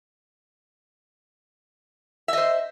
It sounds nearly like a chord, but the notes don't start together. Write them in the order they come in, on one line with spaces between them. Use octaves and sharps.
E5 D#5 C5